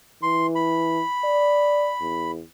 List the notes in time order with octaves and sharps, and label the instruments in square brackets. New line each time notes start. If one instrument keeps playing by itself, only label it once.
[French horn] E3 [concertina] C6
[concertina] B5
[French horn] D5
E2